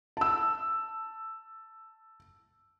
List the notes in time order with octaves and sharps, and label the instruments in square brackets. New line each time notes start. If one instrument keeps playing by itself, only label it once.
[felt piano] A5 E6